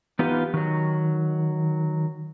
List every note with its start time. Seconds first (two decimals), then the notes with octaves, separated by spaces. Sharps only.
0.19 E3 B3 D#4 F4 G4 B4
0.54 D#3 F#3